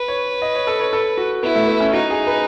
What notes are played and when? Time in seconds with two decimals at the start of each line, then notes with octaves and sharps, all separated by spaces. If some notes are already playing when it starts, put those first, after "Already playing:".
Already playing: B4
0.08 C#5
0.42 D#5
0.55 C#5
0.67 A4
0.80 C#5
0.93 A4
1.17 F#4
1.43 B3 E4
1.55 A3
1.68 B3
1.80 C#4
1.93 D#4 F#4
2.10 G#4
2.27 B4